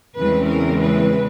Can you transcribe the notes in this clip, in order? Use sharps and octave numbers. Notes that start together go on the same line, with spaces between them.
E2 C#3 E3 G#3 C4 B4
A#4
B4